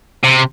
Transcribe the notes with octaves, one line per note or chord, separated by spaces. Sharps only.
C3